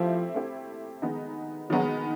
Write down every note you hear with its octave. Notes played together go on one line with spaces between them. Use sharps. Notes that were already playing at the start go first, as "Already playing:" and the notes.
Already playing: F3 A3 C4 E4 G4
A3 C4 E4 G4
D#3 G#3 B3 D#4
D#3 F#3 G#3 B3 D#4